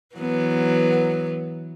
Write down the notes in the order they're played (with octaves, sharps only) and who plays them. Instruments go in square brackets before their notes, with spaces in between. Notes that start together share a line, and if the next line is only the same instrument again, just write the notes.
[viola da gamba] E3 F#3 B3